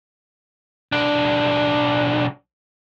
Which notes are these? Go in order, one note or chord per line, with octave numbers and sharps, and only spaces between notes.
B1 D4